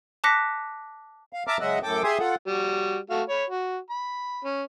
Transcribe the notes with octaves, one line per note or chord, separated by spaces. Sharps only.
A5 D6 F#6 A#6 B6 C#7
F5
E5 A5 A#5 D6 F6
C#3 F#3 G#3 D#5 E5 F#5
F#2 A2 A4 G5 D6
G4 G#4 E5 G#5 C6 D#6
F4 A4 F#5
G3 F#4
A3 F#4 F5
C#5 B5
F#4
B5
C#4